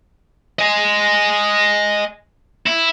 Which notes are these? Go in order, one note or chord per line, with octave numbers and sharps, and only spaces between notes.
D#5 G#5
E4